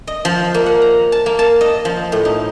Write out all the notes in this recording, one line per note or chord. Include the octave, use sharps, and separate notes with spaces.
D#5
F3
A#3
F#5
A#5
A5
A#3
A5
D#5
F3
A2
D#4